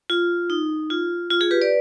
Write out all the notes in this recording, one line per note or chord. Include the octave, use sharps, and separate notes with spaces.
F4
D#4
F4
F4
F4 G#4
G4 B4
B4 D5